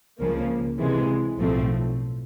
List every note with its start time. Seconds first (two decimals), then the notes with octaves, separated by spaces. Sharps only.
0.19 C#2 C#3 F3 A#3
0.79 C3 E3 G#3
1.37 B1 A2 F3 A3 C4